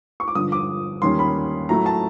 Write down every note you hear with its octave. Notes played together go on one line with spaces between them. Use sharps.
C#6
D6
G2 D3 F3 D#6
D6
D#2 D#3 G3 A#3 C#4 C6
B5
A2 F#3 A3 A#5
A5